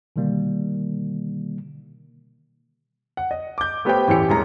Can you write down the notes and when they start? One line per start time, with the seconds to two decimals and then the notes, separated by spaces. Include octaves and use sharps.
0.16 B2 D3 D#3 G3 A#3
3.17 F#5
3.31 D#5
3.58 D6 G6
3.85 A3 B3 G4 B4 C5 G5
4.08 A1 E2 E3 G4 C#7
4.29 E1 G#3 A#5